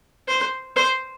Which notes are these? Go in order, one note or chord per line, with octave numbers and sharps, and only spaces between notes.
C5
C5